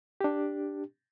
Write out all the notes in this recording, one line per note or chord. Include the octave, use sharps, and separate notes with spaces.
D4 G4